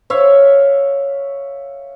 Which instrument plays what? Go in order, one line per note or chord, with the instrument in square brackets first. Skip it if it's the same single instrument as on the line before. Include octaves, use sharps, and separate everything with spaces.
[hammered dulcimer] C#5 E5 F5